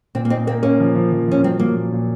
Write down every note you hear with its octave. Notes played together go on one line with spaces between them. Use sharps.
A#2 C4
A#3
C4 D#4
A#3 C4
A#3 C#4
F3
F3
F3
F3 C#4
F#3 C4
F#3 A#3
A#2
A#2